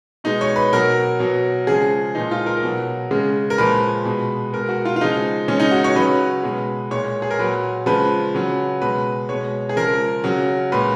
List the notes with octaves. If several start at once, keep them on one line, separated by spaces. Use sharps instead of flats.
B2 G#3 D#4
C#5
B4
B2 F#3 A#4
B2 F#3
C#3 F3 G#3 G#4
A#2 F3 G#3 D#4
F4
A#4
B2 F#3
C#3 G#3
A#4
A#2 F3 G#3 B4
B2 G#3
B2 G#3 A#4
F#4
F4
F4
C#3 F3 G#3 D#4
C#3 G#3 C#4
D#4
F#4
C#5
C#3 F#3 B4
B2 G#3
A#2 G#3 C#5
G#4
A#4
A#2 F#3 B4
C#3 F3 G#3 B4
C#3 F#3
B2 G#3 B4
B2 G#3 C#5
G#4
C#3 F3 G#3 A#4
C#3 F#3
A#2 G#3 B4